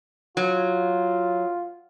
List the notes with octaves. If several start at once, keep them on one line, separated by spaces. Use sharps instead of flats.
F#3 F4